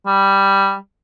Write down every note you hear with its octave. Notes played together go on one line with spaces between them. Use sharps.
G3